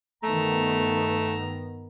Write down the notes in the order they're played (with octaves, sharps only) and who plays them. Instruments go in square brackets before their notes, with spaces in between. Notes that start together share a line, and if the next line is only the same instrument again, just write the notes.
[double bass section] G2 D#3 B3 [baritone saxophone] A3 [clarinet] A#5